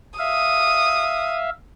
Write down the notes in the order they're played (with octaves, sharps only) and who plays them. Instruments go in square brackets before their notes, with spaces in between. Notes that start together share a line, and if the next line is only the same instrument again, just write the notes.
[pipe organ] E5 F5 [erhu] D#6